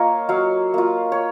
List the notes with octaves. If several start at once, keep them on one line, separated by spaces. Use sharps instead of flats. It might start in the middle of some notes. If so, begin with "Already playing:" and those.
Already playing: A#3 F4 A#4 C#5 D#5
F#3 C#5 F5
A#3 F4
C#5